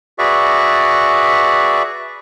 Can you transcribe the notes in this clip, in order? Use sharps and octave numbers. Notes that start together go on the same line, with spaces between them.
F#4 G#4 B4 D5 E5 C#6